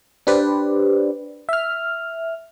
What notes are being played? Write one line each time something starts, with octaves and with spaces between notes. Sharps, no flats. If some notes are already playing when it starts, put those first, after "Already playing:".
D4 G4 B4 C5 D5
E5 F6